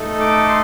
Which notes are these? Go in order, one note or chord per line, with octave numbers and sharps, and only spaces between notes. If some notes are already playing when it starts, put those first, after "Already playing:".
Already playing: A3 D#4 A4
D6
C6